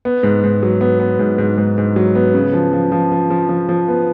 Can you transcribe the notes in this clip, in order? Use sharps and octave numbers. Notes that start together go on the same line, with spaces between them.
B3
G#2
G#2
F#3
B3
B3
G#2
G#2
G#2
G#2
F#3
B3
C#3
F3
F3
F3
F3
F3
F3
F3
B3